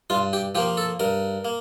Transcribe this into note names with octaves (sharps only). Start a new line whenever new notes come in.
G2 F4
G4
F3 A#3 G4
A4
G2 A#4
A#3